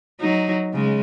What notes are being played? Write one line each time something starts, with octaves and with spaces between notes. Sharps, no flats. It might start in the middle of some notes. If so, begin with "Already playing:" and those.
F#3 D#4
C#3 G#3